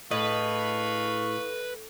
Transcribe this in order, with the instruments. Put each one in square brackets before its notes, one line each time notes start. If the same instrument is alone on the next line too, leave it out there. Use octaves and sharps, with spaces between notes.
[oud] A2 [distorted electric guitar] B4 [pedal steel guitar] D#5 [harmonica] F5 C#6